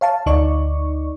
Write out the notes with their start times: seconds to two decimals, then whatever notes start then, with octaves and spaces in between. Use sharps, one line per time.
0.01 C#5 F5 A5
0.26 D2 D#4 D5 C#6